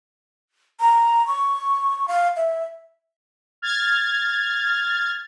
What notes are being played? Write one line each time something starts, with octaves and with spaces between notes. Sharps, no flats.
A#5
C#6
F5
E5
F6 G#6 A6